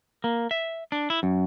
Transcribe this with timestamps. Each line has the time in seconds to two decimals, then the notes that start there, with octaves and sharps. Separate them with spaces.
0.24 A#3
0.51 E5
0.92 D4
1.10 E4
1.23 F#2